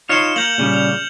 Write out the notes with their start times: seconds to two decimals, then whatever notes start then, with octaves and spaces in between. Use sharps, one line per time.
0.09 D#4 F4 C#5 F6 C#7 E7
0.36 A#3 G6 F7 F#7
0.58 A#2 C#3 G3
0.73 F7